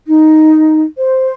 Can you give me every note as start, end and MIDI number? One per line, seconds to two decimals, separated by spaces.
0.08 0.84 63
0.97 1.34 72